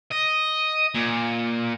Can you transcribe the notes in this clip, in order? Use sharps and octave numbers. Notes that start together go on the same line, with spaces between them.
D#5
A#2